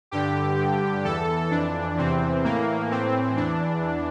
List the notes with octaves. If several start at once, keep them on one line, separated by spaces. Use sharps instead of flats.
G2 D3 G4
G2 D3
E2 E3 A4
F2 E3 D4
E2 C3 E3 C4
A2 E3 A#3
A2 E3 C4
E2 E3 D4